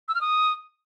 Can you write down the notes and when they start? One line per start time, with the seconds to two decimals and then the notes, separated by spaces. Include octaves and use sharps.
0.08 E6
0.15 F6
0.21 D#6